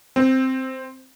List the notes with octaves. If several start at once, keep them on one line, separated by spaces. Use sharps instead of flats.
C4